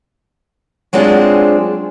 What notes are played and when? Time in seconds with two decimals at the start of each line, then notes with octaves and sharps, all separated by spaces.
0.93 F#3 G#3 C4 D4 F4 G#4